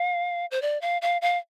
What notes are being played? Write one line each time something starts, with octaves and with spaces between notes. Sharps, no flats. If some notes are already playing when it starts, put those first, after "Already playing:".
Already playing: F5
C5
D5
F5
F5
F5